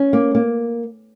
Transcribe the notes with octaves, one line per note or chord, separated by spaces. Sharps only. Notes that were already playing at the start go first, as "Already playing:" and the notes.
Already playing: C#4
A#3
A#3